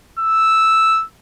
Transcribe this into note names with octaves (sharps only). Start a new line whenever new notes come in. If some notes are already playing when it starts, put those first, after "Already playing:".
E6